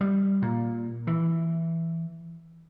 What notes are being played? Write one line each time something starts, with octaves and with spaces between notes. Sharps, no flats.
G3
A#2
E3